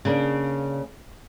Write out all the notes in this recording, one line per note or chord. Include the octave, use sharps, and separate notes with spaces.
C#3 A#3 D4